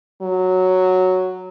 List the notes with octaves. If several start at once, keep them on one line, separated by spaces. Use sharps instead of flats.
F#3